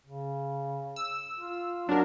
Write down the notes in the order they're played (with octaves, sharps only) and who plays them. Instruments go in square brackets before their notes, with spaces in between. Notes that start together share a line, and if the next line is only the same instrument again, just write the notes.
[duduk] C#3
[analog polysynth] E6
[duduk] F4
[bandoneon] F#3 [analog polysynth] D4 A#4 [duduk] D#4